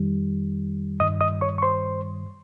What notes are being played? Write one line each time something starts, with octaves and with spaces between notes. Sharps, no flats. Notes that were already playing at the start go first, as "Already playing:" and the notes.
Already playing: F2 D#3 G3
G2 D#3 G3 D#5 D#6
D#5 D#6
C#5 C#6
C#6
C5 C6